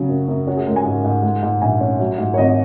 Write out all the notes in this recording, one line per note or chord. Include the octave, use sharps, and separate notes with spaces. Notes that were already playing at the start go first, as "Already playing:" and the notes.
Already playing: C#3 F#3
F#2
F#2
C#4 F#4
G#4
G#3 A#4
G#5
G#2
G#2
G#3
G#2
A#1 G#5
C#4
F#3
G#2
C#5
G#1 D#5